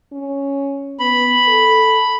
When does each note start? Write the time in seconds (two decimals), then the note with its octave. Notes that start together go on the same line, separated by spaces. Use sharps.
0.12 C#4
0.99 B3 B5
1.47 A4